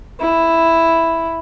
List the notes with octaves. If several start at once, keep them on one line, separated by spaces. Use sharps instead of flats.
E4